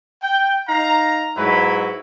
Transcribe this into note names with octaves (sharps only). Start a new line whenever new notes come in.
G5
D#4 F5 A#5
G#2 F#3 E4 B4 B5